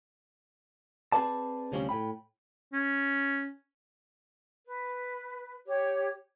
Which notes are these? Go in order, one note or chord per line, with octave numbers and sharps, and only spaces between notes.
C4 G#4 A4 B4 D5 A5
D2 C3 F3 G3 C4 C#4
A2 G5 B5
C#4
B4
G4 C#5